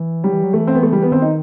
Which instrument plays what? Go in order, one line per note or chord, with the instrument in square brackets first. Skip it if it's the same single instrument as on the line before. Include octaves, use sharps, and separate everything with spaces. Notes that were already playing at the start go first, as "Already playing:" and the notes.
Already playing: [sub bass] E3
[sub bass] F#3 [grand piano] G3
[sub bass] E3
F#3
[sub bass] E3 [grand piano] A3
[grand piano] C4
B3
A3
G3
B3
[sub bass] D#3 [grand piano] C4
[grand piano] D#4